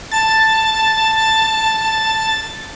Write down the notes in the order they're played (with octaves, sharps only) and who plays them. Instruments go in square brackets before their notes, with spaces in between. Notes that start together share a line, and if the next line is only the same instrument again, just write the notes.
[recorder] A5 [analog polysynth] A6